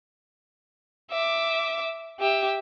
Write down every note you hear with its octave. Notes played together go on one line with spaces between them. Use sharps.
E5 D6
G4 E5